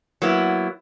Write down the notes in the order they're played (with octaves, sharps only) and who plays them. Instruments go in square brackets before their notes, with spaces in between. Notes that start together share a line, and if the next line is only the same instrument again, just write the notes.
[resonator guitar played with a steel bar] F#3 A#3 B3 E4